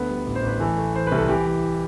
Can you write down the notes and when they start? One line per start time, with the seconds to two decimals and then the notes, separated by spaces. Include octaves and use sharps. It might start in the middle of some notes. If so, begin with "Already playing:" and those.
Already playing: D2 D3 B3 B4
0.09 G3
0.26 A1
0.35 C5
0.43 A1
0.48 B4
0.60 E3 A3 A4
0.78 A3
0.94 E3 C5
1.07 C2 B4
1.18 A4
1.28 E3 G4
1.46 E3